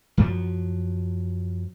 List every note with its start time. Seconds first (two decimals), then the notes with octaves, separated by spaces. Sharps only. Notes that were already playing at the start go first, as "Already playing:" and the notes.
0.17 F#2 F3 F#3